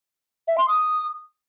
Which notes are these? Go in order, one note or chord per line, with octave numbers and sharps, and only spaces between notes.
E5
C6
D#6